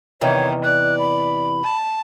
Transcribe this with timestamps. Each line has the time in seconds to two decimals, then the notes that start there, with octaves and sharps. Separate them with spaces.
0.21 E2 C3 D#3 E3 C#5
0.64 D5 F#6
0.99 B5
1.63 A5